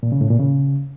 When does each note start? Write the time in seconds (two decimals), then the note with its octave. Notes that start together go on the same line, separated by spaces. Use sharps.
0.03 A#2
0.12 C#3
0.21 A2
0.30 A#2
0.39 C#3